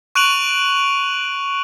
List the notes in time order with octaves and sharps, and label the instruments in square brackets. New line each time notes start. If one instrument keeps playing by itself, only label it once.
[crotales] C#6 F#6 D7 D#7 F7 F#7